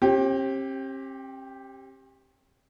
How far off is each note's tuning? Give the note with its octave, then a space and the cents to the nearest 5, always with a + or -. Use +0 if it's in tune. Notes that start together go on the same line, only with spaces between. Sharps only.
C4 +45 G4 +0